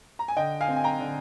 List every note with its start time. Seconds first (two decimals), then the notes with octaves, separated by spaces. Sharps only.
0.19 A#5
0.28 G#5
0.36 D3 D#5 G5
0.61 F5 G#5
0.68 C4
0.76 G#5
0.84 G5 A#5
1.00 D3